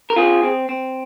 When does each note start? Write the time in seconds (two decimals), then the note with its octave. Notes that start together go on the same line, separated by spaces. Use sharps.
0.10 A#4
0.16 C4 F4 G#4
0.43 C4
0.69 C4